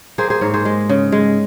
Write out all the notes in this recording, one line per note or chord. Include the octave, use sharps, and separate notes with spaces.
A#3 G#4 C5
G#4 C5
G#2 A#4 C#5
G#4 C5
G#3
C#3
G#3